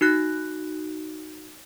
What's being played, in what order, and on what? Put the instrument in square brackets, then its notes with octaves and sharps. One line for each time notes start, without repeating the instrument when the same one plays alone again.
[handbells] D#4 F#4 F#6 A#6